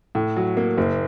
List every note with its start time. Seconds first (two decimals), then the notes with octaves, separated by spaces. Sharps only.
0.15 A2
0.36 F#3
0.57 A#3
0.77 F#1